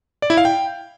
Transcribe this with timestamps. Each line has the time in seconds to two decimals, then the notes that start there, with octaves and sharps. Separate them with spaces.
0.22 D5
0.30 E4
0.37 F5
0.45 G5